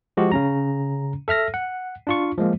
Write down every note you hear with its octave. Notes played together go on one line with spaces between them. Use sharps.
F3 G#3 F#4 G4
C#3 C#4 A#5
A4 E5 F6 A#6
F#5
D4 F4 C#6
F3 G#3 A#3